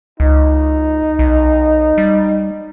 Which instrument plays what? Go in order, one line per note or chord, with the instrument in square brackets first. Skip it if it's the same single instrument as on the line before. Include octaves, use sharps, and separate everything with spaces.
[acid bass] C#2 [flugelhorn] D#4
[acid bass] B1
G3